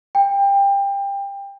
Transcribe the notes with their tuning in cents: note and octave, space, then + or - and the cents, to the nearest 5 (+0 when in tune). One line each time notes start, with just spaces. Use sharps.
G5 +25